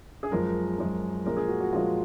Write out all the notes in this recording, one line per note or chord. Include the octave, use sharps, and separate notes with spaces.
G#4
F#2 F3 G#3 A#4
F#2 F3 G#3
A#2 F3 G#3 A#4
G#4
F#4
F#4
A#2 F3 G#3 F4